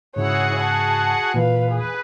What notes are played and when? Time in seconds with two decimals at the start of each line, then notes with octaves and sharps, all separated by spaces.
0.16 G#2 C#3 E4 F#4 G#4 C#5 F#5
0.60 A5
1.34 A#2 E3 B4 F5
1.71 G#4 B4